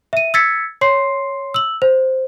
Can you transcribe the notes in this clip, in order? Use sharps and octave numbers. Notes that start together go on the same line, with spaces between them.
E5 D#7
E6 G#6 A6 B6 C#7
C#5 C6 C7
E6 F#7
C5